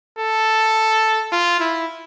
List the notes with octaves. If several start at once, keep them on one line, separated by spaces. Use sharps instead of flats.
A4
F4
E4